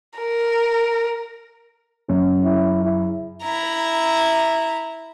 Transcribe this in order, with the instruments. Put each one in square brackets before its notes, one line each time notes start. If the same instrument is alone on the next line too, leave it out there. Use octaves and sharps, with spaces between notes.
[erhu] A#4
[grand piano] F#2 C#3
[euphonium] E4
E4
[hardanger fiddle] E4 A#5